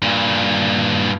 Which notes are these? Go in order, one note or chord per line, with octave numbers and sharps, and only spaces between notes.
G2 A#2